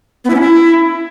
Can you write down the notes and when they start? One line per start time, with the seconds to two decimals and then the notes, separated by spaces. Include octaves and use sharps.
0.25 B3
0.30 E4
0.35 C#4
0.40 E4